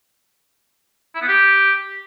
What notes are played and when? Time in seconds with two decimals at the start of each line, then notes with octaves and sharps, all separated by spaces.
1.15 E4
1.21 B3
1.28 G4